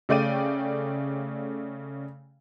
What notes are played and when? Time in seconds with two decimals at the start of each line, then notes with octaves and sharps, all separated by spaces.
0.09 C#3 A3 D5 G5 A6 D#7